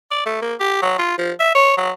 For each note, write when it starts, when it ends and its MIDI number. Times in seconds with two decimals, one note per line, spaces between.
0.11 0.25 74
0.26 0.41 57
0.42 0.54 58
0.60 0.77 67
0.82 0.95 54
0.98 1.17 65
1.18 1.32 53
1.40 1.53 76
1.55 1.76 73
1.77 1.91 54